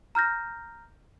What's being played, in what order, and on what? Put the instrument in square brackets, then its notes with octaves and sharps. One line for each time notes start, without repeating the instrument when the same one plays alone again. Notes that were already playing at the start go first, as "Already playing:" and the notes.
[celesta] A#5 F6 G6 A#6